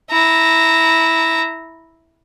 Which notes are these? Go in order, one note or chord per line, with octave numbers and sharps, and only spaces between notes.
E4 A#5